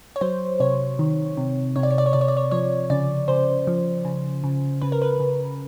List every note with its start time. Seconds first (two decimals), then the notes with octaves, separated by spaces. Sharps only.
0.16 C#5
0.21 F#3 C5
0.60 C3 C#5
0.99 D#3
1.37 C3
1.76 C3 C#5
1.83 D5
1.91 C#5
1.98 D5
2.06 C#5
2.13 C3 D5
2.21 C#5
2.28 D5
2.37 C#5
2.51 F3 C#5
2.90 C#3 D5
3.28 C#3 C5
3.67 F3
4.05 C#3
4.44 C#3
4.81 C#3 B4
4.92 A#4
5.02 B4
5.20 C#3